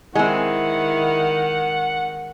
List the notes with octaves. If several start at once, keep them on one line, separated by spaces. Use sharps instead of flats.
D#3 G#3 C4 E4 F#5